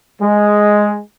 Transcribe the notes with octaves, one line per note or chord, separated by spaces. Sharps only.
G#3